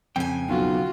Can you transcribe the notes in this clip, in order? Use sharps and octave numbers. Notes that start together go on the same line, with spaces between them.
F2 C#3 C4 G5 G#5
B1 F4 F#4